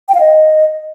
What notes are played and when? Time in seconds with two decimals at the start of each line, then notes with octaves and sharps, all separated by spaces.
0.09 G5
0.14 F5
0.20 D#5